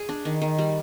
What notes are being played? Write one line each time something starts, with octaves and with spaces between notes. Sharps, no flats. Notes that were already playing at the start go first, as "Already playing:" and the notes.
Already playing: G#4
D4
D#3
D#3
G3